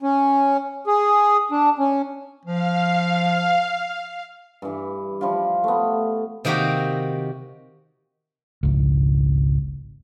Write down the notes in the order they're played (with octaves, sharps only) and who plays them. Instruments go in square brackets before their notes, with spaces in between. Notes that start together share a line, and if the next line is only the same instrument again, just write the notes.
[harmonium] C#4
G#4
D4
C#4
[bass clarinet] F3 [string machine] F5
[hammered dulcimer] G2 E3
F3 G3 E4 F4
A3 B3
[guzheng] C3 D#3 A#3 F#4 G4
[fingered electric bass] G#1 C#2